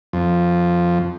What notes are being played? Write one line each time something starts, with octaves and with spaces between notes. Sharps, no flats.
F2